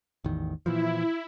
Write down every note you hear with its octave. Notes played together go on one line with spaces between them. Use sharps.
A1 E2 D#3
A#2 E3 F3 E4